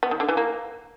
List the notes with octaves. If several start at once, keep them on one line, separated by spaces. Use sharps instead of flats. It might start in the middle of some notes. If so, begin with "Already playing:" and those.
B3
D#3
D3
E3
A#3